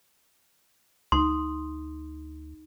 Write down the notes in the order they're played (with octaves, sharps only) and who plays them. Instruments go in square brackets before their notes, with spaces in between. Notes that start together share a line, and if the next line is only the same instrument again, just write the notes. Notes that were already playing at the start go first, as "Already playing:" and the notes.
[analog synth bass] D2 [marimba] D#4 [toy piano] C6